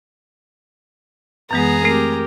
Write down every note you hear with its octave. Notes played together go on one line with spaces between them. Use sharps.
F#2 E3 G#3 B3 G#4 A#5
A3 C4 G4 A#4